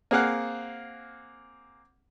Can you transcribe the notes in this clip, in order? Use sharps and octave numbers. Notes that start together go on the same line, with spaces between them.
A#3 C4 G#4 F5 F#5